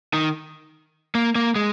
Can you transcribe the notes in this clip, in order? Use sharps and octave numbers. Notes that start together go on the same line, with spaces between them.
D#3
A#3
A#3
G#3